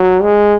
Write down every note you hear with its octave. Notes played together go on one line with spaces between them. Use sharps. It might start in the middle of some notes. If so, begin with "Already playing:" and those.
Already playing: F#3
G#3